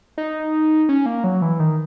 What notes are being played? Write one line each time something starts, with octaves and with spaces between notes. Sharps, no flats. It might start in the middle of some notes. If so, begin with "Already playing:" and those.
D#4
C#4
A#3
F#3
E3
D#3